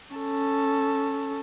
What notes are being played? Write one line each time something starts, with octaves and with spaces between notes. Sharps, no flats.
C#4 A4